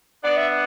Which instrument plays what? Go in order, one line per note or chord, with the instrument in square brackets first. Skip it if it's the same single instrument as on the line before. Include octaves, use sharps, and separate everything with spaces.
[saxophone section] B3 D4 [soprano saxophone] D5
[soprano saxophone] E5